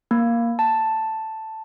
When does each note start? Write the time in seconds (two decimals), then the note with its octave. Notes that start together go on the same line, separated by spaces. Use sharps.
0.11 A#3
0.59 A5